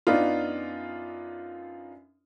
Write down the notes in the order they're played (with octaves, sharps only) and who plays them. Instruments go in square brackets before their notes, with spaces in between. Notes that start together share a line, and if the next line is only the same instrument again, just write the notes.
[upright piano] F#2 B3 D4 D#4 F4